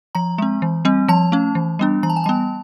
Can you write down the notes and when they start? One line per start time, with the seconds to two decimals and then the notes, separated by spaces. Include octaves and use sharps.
0.15 F3 A#5
0.38 G#3 C4
0.62 E3
0.85 G3 C4
1.08 F3 A5
1.32 A3 C#4
1.55 E3
1.79 G3 B3 D4
2.03 E3 A#5
2.10 A5
2.16 G#5
2.24 G3 B3 A5